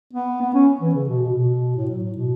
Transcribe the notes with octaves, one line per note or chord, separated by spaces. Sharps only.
B3
B3
C#4
E3
C#3
B2
B2
B2
A2
F#3
A2
B2